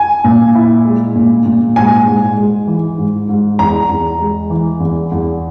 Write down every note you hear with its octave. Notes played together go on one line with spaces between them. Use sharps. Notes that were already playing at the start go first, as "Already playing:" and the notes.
Already playing: G#5
A#2
E4
G#3
A#2
A#2
G#2 G#5
G#2
G#3
E3
G#2
G#2
E2 A#5
E2
G#3
E3
E2
E2